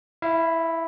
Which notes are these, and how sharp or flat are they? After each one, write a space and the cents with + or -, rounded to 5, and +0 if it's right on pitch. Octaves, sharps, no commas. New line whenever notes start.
E4 +0 F5 -40